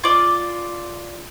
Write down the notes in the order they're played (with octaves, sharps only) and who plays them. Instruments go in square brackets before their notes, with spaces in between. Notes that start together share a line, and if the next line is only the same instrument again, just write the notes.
[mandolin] F4 D5